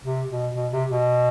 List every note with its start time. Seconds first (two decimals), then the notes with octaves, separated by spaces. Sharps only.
0.04 C3
0.30 B2
0.55 B2
0.72 C3
0.89 B2